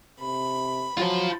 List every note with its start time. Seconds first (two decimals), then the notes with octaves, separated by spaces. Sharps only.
0.21 C3 B5
0.98 F#3 F4 C5